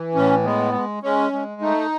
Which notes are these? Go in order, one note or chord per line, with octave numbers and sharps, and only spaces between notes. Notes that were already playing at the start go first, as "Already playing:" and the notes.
Already playing: E3
A2 C#4
G#3 B3
G#3
G#3 C#4
G#3
A3 D#4